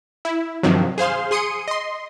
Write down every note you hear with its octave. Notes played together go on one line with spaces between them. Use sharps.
E4
G2 C3 D#3 F3 F#3
G#4 C5 F5 C6
G#4 C6 D#6 C#7 D#7
D#5 C6